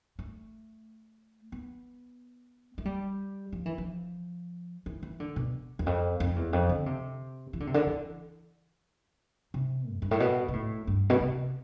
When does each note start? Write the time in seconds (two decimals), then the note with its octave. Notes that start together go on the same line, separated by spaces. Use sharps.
0.19 A3
1.52 B3
2.78 A3
2.85 G3
3.52 F3
3.66 E3
3.78 F3
4.86 E3
5.03 E3
5.20 D3
5.36 B2
5.79 E2
5.86 F2
6.20 F2
6.36 E2
6.53 F2
6.69 D3
6.86 C3
7.53 E3
7.60 D3
7.67 C3
7.74 D3
7.87 E3
9.54 C3
9.93 F2
10.02 G2
10.11 A2
10.20 B2
10.48 B2
10.53 A2
10.87 G2
11.10 B2
11.20 C3